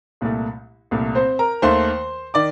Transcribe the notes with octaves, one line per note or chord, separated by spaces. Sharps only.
C2 A#2 A3
C2 A#2 A3
C4 C5
A#4 A#5
D#2 D#3 A3 C5 C6
D#3 D5 D6